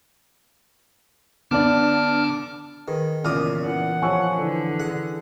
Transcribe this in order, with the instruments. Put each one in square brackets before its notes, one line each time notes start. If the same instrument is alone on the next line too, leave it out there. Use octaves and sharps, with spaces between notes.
[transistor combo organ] D3 D6 [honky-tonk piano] B3 D4 [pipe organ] A5 F6
[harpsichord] D#3 [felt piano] G#4 B4
[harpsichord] E2 A#2 D#5 [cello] C#3 [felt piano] D6 F6
[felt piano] E3 [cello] F#5
[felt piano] F3 C#5 [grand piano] G#5 C#6 E6
[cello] D3 [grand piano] E3 A4
[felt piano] G#4 [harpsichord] F#5